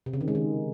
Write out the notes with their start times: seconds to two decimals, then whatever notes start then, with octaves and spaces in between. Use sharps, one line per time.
0.06 C3
0.13 C#3
0.21 D#3
0.28 G#3
0.35 D#3